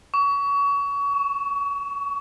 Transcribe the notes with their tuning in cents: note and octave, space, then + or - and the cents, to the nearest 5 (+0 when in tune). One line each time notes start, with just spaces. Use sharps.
C#6 +30
C#6 +0